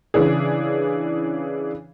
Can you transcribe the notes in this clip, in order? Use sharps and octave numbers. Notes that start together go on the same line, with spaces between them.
C#3 E3 D4 G#4